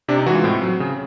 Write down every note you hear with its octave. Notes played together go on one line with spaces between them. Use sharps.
C3 D4
D#4
E3 G#3 F4 F#4
A2 C4
F#3
C#3